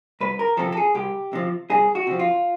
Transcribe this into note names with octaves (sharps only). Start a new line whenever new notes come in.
C2 B4
A#4
C3 F3 A4
A4
G#4
C2 G4
C3 F3
C2 G#4
F#4
C3 F3
F4